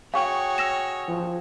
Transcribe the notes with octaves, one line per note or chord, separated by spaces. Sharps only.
F#4 G#4 C#5 F5 G5 C#6
E6 A#6 E7
F3